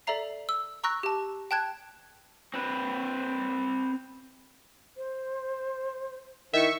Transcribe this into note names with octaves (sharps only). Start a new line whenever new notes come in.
A4 D5 E5 A#5 C7
E6
A#5 C#6 E6 F#6 A#6
G4 A5
G5 A5 F#6 G#6
C4 B4
C5
D#3 E4 E5 C#6